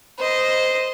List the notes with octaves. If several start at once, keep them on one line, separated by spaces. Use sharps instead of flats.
C5 D#5